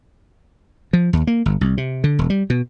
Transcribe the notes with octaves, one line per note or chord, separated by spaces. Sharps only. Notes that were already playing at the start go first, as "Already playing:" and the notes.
F3
D#2
A#3
G1
C2
C3
D3
E1
G3
B2